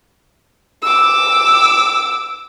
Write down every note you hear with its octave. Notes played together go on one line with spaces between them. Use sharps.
D6 E6